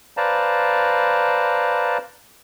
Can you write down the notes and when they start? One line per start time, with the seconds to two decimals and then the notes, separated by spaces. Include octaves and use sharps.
0.17 B4 C5 D5 F5 A5 A#5